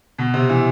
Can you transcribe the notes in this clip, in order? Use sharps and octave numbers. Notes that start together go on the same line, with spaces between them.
B2
C3
E3